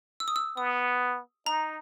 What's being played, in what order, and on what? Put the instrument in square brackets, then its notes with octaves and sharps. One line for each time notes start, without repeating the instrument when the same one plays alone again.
[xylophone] E6
D#6
E6
[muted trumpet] B3 [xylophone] D#6
[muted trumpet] D#4 [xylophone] A#5